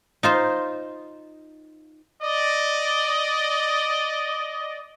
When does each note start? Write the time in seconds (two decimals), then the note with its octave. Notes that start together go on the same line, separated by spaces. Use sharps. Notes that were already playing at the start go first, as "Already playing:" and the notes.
0.23 D#4 F4 C5
2.22 D5 D#5